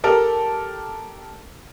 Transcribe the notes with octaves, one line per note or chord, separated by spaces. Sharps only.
G4 A4 A#4